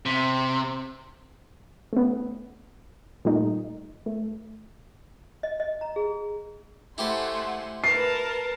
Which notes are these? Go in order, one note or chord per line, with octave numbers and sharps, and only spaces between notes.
C3
A3 B3
A#2 G3 A3 D#4
A3
D#5
D#5
A#5
G#4
A3 E4 G4 C5 F#5 G#5 C6
A#4 B4 A5 C7